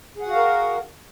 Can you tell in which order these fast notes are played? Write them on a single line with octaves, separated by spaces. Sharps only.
G#4 F#5 F#4 F5 A#4